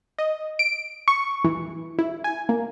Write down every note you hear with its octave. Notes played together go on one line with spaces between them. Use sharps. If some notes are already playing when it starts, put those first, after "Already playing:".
D#5
D7
C#6
E3
E4
G#5
A#3